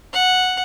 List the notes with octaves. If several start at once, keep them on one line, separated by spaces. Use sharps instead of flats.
F#5